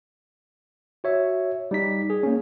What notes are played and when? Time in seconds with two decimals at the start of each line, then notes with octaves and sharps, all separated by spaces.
1.04 F#4 C#5 E5
1.71 G3 D#4 B6
2.10 G#4
2.23 A#3 C#4